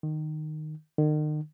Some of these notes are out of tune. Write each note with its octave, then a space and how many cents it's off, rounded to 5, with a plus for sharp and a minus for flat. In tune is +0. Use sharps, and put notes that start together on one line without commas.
D#3 -15
D#3 -40